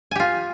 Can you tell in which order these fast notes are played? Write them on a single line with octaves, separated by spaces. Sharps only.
G#5 G4 F4